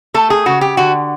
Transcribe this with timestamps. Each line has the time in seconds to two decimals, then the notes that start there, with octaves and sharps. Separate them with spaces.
0.14 A3 A4
0.30 G#4
0.46 C#3 F#4
0.61 G4
0.77 D3 F#4